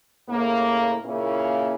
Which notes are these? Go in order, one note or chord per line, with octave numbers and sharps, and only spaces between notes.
A2 C#3 A#3
A#2 C#3 A#3 C#4 E4